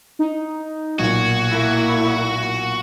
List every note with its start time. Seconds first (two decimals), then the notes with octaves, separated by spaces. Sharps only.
0.19 D#4
0.99 B1 A#2 F#4 G#6
1.49 A#3 E4